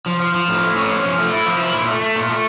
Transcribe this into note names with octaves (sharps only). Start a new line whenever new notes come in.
F3
F3
F3
A2
A2
C#4
F3
F3
A3
E4
F3
E4
A#2
A3
A3
A#2
A3